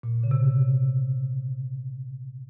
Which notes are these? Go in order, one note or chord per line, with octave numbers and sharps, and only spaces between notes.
A#2
C#3
C3